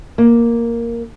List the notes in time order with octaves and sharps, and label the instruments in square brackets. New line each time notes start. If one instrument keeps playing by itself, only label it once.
[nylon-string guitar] A#3